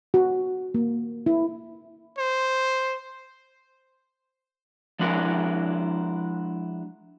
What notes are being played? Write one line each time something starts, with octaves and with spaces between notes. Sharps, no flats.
F#4
A#3
E4
C5
F3 G#3 D4 E4 F#4 A#4